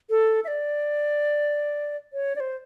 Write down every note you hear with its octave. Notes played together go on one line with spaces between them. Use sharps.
A4
E5
D5
C#5
D5
C5